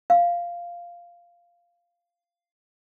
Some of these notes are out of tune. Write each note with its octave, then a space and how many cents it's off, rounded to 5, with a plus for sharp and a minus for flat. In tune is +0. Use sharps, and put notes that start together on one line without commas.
F5 -5